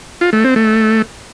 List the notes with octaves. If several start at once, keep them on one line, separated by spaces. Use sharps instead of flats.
F4
A3
C4
A3